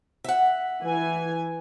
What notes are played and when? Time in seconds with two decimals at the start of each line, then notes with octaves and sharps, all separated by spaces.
0.24 E5 F#5
0.82 E3 G#5